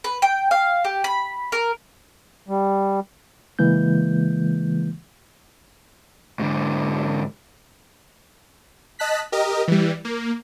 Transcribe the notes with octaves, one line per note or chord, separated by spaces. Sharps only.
B4
G5
F5
G4
B5
A#4
G3
C#3 E3 G#3 A#3 G6
G#2 D3
D#5 A5 F#6 B6
G4 A#4 D#5
E3 G3
A#3